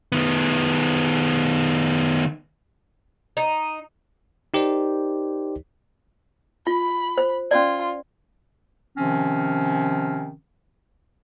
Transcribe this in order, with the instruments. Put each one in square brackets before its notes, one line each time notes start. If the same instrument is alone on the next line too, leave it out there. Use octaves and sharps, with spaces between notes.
[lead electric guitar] D#3 B3
[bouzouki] D#4
[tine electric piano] D#4 G4 A#4 C5 D5
[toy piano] F4 [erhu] B5
[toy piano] C5
[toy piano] C#4 D5 [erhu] F4
[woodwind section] C3 D#3 F3 C4 C#4